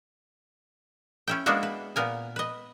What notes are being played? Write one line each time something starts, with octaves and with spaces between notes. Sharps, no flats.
C#4 E4 G5
G#3 A#3 B3 D4 E4 F#4
B4
A#2 B3 A#4 G#5
B4 D#5